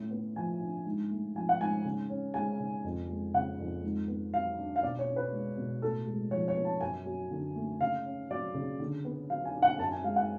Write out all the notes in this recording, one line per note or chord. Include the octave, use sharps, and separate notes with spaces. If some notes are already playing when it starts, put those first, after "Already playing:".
Already playing: A2 C#4
B3
F3 G#5
D4
G#2
A3
F3 G#5
F#5
G#2 G#5
C#3
C#4
G#3 G#5
C#3
F2
G#3
C#3 F#5
F2
G#2
B3
F#3 F5
D4
F5
B2 D5
C#5
C#4
B4
G#3
B2
A2 A4
G#3
F3 C#5
C#5
B3
A5
F#2 G#5
F#3
D3
A3
C#3 F5
C#4
F#3 D5
C#3
D3
B3
F#3 F5
G#5
D4
F#5
F#2 A5
G#5
G#3 F5
F#5